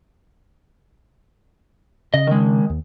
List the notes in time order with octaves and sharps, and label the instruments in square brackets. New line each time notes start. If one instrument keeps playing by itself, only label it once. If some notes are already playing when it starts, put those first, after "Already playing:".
[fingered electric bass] C#3 [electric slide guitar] D#5
[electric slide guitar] D#3 G#3
[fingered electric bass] D#2